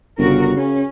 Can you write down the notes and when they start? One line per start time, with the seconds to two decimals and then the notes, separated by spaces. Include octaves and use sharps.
0.18 G1 C#3 F#4 A#4
0.56 C#3 C#4